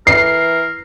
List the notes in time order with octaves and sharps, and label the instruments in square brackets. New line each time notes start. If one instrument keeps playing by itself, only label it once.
[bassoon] E3 [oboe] A#4 [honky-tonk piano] C7